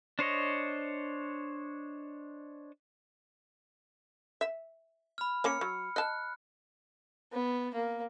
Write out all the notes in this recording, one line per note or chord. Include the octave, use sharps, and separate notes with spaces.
D4 C5 C#5 D#5
E5
B5 F6
A#3 C#4 F6 C#7
F#3
D#5 A5 F#6
B3
A#3